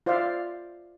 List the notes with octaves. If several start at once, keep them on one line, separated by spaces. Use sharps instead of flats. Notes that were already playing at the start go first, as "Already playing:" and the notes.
F4 C5 D5 E5 F5